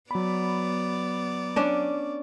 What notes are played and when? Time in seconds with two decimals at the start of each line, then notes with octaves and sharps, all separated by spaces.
0.11 F#3 B3 D5 B5
1.56 C#4 D4